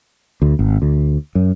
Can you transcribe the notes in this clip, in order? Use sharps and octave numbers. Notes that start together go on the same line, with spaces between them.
D2
G#1
D2
F#2